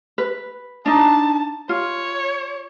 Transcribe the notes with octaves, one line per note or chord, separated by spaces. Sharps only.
B4
D4 D#4 A5
F4 C#5